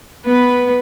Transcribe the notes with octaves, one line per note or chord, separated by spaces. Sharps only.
B3 B4